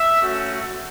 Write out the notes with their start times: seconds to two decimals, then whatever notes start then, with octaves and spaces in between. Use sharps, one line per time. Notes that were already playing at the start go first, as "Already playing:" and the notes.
Already playing: E5
0.20 A3 C#4 F#4